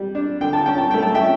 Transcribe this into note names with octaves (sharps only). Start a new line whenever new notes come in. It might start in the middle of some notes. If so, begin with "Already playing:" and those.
Already playing: G3
D4
D3 G5
A5
C#4 G5
A5
A3 G5
A5
E5 G5
C#4